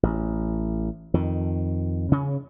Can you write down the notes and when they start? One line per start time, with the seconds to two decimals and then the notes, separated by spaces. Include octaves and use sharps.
0.03 A1
1.14 F2 D#3
2.12 C#3 C#4